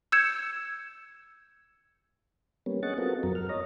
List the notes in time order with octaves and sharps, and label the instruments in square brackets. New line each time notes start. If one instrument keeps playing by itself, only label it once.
[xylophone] E6 G6 G#6 C#7 E7
[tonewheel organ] G3 A#3 B3 C#4
C#4 G#4 D#5 F#5 C#6 A6
B3 C4 F4 F#4 A4 A#4
F#2 F#3 A#4
F6
C#5 D#5 A#5